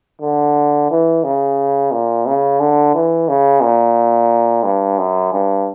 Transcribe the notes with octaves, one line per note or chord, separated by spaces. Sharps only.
D3
E3
C#3
A#2
C#3
D3
E3
C#3
A#2
G2
F#2
G2